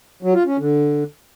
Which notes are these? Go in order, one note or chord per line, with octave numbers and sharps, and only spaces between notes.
F#3
F4
C#4
D3